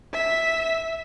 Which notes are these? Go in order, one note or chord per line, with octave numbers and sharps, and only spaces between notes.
E5 B6